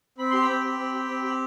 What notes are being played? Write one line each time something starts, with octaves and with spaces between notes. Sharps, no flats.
C4 B5
G4 C6
G5 B5
C4
G4
C4
G4
C4
G4